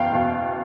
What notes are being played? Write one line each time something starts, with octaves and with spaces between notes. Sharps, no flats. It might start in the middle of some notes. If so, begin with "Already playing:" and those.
Already playing: F#1 E2 B2 F5 G5
E2 B2